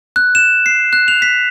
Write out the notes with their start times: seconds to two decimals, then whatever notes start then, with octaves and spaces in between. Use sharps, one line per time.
0.16 F#6
0.35 E7
0.66 C7
0.93 F#6
1.08 F7
1.22 B6